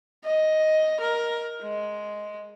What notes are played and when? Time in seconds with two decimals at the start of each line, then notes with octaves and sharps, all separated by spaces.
0.24 D#5
1.00 A#4
1.62 G#3